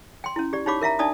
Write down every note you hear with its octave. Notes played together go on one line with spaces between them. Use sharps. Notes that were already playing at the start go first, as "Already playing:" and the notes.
G5 C6
C#4 E4
G4 D5
D#4 G4 C#5 F5 B5 D6
A#4 E5 F5 A#5
D4 D#4 D5 A5 D#6